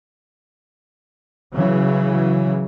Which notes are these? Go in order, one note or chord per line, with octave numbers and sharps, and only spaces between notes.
C#3 E3 F#3